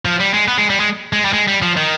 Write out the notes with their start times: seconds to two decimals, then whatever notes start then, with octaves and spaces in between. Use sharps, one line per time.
0.05 F3
0.20 G3
0.34 G#3
0.48 B3
0.58 G#3
0.70 G3
0.80 G#3
1.13 G#3
1.25 G3
1.33 G#3
1.48 G3
1.62 F3
1.77 D#3